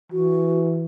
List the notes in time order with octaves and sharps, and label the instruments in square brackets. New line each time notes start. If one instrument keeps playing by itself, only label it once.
[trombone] E3 [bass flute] F#4